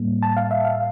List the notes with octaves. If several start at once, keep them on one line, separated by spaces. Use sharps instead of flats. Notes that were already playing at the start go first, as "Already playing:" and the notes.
Already playing: A2 G3 A#3
A5
F5
E5
F5